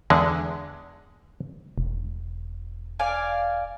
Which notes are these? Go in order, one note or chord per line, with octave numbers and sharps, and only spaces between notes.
E2 D3 G#3
E1
D5 F5 G#5